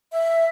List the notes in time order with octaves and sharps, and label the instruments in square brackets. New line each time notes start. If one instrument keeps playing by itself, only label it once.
[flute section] E5